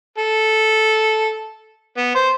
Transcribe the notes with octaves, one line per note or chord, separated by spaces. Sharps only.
A4
B3
C5